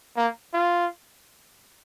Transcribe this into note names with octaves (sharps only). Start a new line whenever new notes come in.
A#3
F4